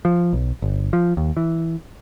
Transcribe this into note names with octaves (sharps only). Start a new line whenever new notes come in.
F3
B1
G1
F3
D#2
E3